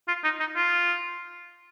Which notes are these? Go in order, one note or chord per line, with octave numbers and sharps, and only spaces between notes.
F4
D#4
D#4
F4